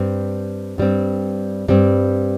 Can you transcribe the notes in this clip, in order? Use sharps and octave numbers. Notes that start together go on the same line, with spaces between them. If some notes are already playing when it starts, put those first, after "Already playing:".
Already playing: G2 G3 C4
G2 G3 C4
G2 G3 C4